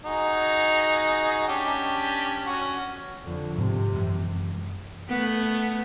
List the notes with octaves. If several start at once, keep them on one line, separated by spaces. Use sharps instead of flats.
D#4 F#4 G#4
C#4 D4 G4
C#4 F#4
F2 D3
G#2 C3
F#2 E3 G#3
A3 B3